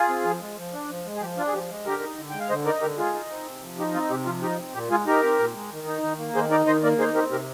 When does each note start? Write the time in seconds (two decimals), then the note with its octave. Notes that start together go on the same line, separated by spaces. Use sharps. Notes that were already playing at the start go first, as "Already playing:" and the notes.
Already playing: F4 G#4
0.09 C4
0.24 F3
0.41 G#3
0.57 F3
0.73 D4
0.89 F3
1.06 G#3
1.16 G#4
1.21 F3 G4
1.37 D4 F4
1.48 G#4
1.53 F3 G4
1.70 G#3
1.85 D3 G4 A#4
2.02 D#4
2.18 D3
2.30 G#3 G5
2.40 F5
2.49 D3 C5 D#5
2.65 D#4 A#4 D5
2.82 D3 G4 A#4
2.97 G#3 F4 G#4
3.14 D#4
3.30 C4
3.46 C3
3.62 F3
3.78 D#4 G4
3.94 C4 F4
4.10 C3 G4
4.26 F3 F4
4.42 D#4 G4
4.59 C4
4.74 A#2 G4
4.90 G#3 F4 G#4
5.06 D#4 G4 A#4
5.23 C4
5.39 A#2
5.55 G#3
5.71 D#3
5.87 D#4
6.03 D#3
6.18 A#3
6.35 D#3 G#4 C5
6.51 D#4 A#4 D5
6.67 D#3 C5 D#5
6.83 A#3 A#4 D5
6.99 D#4 G#4 C5
7.15 C4 G4 A#4
7.31 C3 G4 A#4